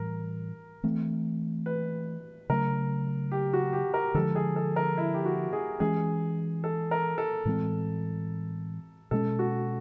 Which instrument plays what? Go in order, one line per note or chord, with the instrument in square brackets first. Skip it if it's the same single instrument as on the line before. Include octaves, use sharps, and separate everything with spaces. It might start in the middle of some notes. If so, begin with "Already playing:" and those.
Already playing: [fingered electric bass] A2 E3 G3 [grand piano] A#4
[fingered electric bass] E3 A3 C4
[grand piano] B4
[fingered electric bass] C#3 F#3 A3 [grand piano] A#4
[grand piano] G4
F#4
G4
A#4
[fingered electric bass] D3 F3 G#3 [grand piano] A4
[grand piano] G#4
A4
A#4
E4
G4
F#4
G#4
[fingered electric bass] E3 G#3 C#4 [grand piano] G#4
[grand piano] A4
A#4
A4
[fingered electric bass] A2 E3 G#3 C4
[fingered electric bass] B2 G#3 C#4 [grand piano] A4
[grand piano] F#4